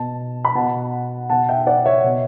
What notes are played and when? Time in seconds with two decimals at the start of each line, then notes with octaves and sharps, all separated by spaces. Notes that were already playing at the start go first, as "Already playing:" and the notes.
Already playing: B2 A5
0.45 B5
0.55 B2 F#5 A5
1.30 B2 F#5 A5
1.49 E5 G5
1.66 D5 F#5
1.86 C#5 E5
2.04 B2